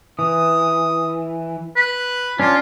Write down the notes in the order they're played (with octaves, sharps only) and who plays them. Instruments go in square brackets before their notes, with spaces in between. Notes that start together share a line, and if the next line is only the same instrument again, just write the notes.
[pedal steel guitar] E3 [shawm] D#6
[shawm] B4
[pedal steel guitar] C#4 D4 [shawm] F4